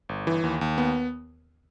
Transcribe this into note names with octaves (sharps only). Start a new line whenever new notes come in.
G1
E3
D#2
D#2
B3